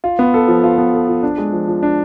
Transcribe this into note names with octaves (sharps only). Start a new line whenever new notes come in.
F4
B3
A4
F3
F4
B3
A4
F3
D4
G#3
F3
F3
D4